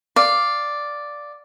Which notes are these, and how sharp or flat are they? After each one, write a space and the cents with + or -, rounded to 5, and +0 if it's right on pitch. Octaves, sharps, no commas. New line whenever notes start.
D5 +0 F5 +0